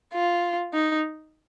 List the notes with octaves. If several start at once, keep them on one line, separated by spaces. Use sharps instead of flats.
F4
D#4